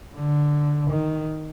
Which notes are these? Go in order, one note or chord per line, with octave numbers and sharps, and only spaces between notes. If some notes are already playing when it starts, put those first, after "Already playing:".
D3
D#3